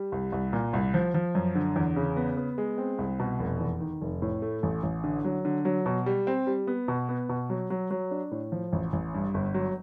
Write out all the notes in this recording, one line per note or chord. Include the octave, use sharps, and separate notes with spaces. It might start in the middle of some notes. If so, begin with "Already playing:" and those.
Already playing: G3
C2
C2
A#2
C2
F3
F3
F#2
D3
E2
C#3
B3
B3
G#3
C4
C2
B2
F1
E2
D#3
F1
A2
A3
A1
A1
D3
F#3
D3
F#3
B2
G3
C4
G3
B3
B2
B3
B2
F#3
F#3
F#3
D4
A2
F3
A1
A1
G2
G1
F#3